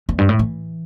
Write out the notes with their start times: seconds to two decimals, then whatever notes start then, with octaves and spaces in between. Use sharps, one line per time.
0.09 E2
0.18 G2
0.29 A2
0.39 E3